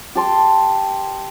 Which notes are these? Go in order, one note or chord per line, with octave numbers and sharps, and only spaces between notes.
G4 A5 C6